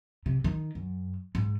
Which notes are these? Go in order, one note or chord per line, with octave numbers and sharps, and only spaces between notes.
C3
D#3
F#2
G#2